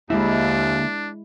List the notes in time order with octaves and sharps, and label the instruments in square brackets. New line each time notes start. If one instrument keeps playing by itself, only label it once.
[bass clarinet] D#2 [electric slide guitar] D3 A#3 E5 [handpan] G#3 E4 [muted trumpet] D4